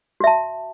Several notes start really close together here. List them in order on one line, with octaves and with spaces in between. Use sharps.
F#4 E5 A5